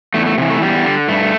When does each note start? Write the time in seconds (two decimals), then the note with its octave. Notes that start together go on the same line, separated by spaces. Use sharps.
0.14 E2 A3
0.26 A3
0.38 C3 G3
0.41 E3
0.49 A3
0.62 E2 G3
0.85 D3
1.08 G2 A3